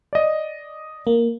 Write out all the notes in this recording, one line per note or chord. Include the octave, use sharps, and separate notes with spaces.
D5 D#5
A#3